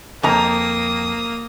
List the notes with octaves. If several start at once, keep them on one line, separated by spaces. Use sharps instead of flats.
F2 A#3 A#5 D#6